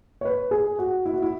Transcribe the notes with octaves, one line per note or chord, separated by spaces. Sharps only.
C#5
B4
G#4
F#4
E4
F#4
E4